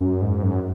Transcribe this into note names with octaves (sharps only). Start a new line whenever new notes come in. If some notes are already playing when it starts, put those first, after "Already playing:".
F#2
G#2
F#2